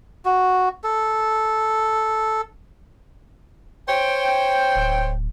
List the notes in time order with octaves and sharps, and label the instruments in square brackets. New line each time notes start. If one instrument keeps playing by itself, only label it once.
[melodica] F#4
A4
[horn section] C5 C#5 G5
[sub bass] D1